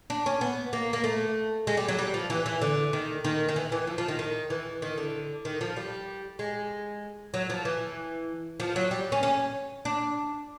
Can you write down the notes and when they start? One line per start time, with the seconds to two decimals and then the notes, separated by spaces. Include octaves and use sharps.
0.10 D4
0.26 C#4
0.41 B3
0.73 A#3
0.93 A#3
1.04 A3
1.67 G#3
1.77 G3
1.88 F#3
1.99 G3
2.14 F3
2.30 E3
2.46 E3
2.62 D3
2.93 D#3
3.24 D#3
3.49 D#3
3.56 E3
3.72 E3
3.87 F3
3.98 F3
4.08 D#3
4.19 D#3
4.50 E3
4.82 D#3
4.98 D3
5.45 D#3
5.61 F3
5.76 G3
6.39 G#3
7.34 F#3
7.50 F3
7.65 E3
8.60 F3
8.76 F#3
8.91 G3
9.12 C#4
9.23 C#4
9.85 D4